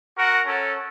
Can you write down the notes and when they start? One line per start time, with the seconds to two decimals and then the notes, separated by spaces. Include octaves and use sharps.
0.17 F#4 A#4 F#5
0.46 C#4 A4